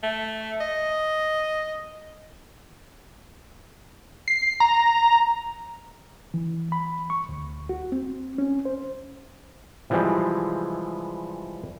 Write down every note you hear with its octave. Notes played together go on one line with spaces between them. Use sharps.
A3
D#5
C7
A#5
E3
B5
C#6
D2
F#4
C4
C#4
C5
C3 E3 F3 G3 G#3